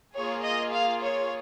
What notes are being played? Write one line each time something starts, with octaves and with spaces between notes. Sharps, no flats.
A#3 F4 G#4 C#5
D#5
F5
C#5